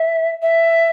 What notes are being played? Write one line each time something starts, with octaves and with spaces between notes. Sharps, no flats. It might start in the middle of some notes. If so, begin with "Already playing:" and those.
Already playing: E5
E5